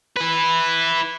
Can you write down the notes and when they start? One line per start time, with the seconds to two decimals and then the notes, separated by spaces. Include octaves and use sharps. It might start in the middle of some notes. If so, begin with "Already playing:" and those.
0.17 E4 B4